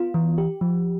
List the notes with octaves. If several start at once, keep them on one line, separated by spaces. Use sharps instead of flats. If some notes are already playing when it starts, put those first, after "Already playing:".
Already playing: B3 F4
E3
G4
F3